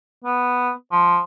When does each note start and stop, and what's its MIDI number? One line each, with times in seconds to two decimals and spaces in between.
0.25 0.72 59
0.92 1.20 53